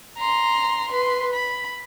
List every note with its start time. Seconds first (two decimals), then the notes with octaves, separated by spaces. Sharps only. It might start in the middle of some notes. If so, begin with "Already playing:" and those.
0.18 A#5 C6
0.92 B4 C6
1.33 B5